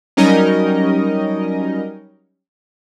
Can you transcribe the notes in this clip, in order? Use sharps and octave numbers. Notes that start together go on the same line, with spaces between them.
F#3 G3 C#4 D#4 A#4 D#5